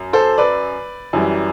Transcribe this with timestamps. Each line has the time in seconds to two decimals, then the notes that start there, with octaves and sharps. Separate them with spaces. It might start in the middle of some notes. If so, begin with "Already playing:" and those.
Already playing: F#2
0.13 A4 C5
0.38 B4 D5
1.13 F#2 E3 G3